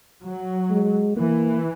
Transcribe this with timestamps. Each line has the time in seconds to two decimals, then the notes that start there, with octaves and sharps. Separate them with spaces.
0.24 F#3
0.70 G#3
1.17 E3 A#3